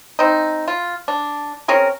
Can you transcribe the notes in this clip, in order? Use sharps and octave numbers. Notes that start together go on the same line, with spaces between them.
C4 D#4
F4
D4
C4 C#4 G#4 A#4